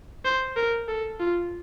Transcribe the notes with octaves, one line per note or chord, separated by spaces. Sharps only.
C5
A#4
A4
F4